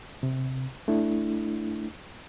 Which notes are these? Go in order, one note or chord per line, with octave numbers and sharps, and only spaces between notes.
C3
A3 D4 E4